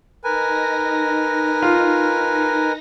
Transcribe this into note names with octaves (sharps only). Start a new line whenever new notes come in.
D#4 A#4 B4 G#5 A#6
F4